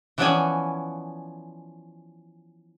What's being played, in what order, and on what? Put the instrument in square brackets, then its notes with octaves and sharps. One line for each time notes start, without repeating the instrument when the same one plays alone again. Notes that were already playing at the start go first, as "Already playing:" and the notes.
[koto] E3 F3 B3 C#4 D5 G#5